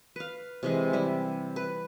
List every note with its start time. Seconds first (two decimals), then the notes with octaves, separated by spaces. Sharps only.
0.16 B4 F5
0.63 C3 E3 G#3
0.93 G3 E4
1.56 B4